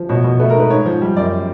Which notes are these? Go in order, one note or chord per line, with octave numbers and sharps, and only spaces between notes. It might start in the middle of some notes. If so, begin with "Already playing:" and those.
Already playing: F3
B2 C#5
B2
A3 B4
A#4
G#2
B4
G#2 C#5
F3
G3
F#2 D5